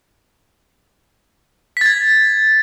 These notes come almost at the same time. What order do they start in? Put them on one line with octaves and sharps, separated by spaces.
B6 A6 G#6